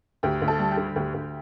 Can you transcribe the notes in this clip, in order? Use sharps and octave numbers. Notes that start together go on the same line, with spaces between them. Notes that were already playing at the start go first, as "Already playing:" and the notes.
D2 G4
D2
A4
G3
G4
D3
D2 G4
D2